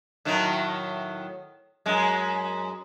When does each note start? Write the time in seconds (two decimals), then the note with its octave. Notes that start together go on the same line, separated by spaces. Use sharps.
0.25 A2 D#3 F#3
1.86 F#2 G#3